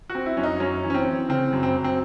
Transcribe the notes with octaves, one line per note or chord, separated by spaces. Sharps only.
F#4
C4
E4
F#2 C#4
D#4
F#2 C#4
E3
C#4
C4
E3
C#3 C4
F#2
C4
F#2
C4